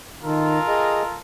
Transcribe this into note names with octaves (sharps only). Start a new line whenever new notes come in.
D#3 F4 A4 A#4
G#4 D#5